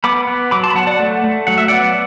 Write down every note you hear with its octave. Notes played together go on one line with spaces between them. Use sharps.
B3 B5 D6
B3
F#3 B5 D6
A5 C6
B5
F#3 F#5 A5
D5 F#5
A3
A3
F#3 F#5
E5
B3 D5 F#5